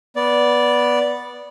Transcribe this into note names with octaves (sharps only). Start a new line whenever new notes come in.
B3 D5